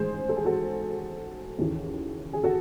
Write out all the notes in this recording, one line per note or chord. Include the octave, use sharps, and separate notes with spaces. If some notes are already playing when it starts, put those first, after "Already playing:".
Already playing: A1 G#2 D#3 G#4 C5
A4
G#4
F#4 A4
D#2 C#3 E3
G#4
F#4 A4